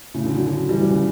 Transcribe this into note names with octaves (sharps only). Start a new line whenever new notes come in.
A2 C#3
D3 F#3
D3 F#3
D3 F#3
E3 G3
C#3 E3
C#3 E3